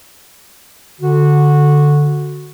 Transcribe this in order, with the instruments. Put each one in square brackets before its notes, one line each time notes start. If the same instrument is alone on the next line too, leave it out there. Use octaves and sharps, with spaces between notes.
[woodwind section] D3 F#4